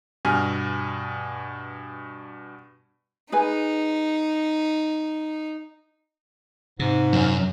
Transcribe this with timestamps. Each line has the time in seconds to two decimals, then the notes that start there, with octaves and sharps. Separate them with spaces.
0.25 G2 B2 G#5 F6
3.32 D#4 G#4 B4 G#5
6.79 G#2 C3
7.13 F#2